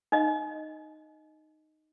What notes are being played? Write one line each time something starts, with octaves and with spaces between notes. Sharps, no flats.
D#4 D#5